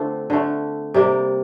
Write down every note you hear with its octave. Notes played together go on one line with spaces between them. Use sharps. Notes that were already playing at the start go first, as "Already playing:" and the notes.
Already playing: D3 A3 C4 D4 F4
D3 A3
C3 G3 A#3